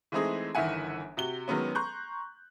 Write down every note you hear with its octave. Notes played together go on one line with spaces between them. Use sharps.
E3 G#3 A3 C4 D#4 G#4
G1 D#3 E3 E5 F#5 G#5
C3 F#4 G7
D#3 F#3 G#3 B3 C#4
A#5 C6 C#6 F#6 G6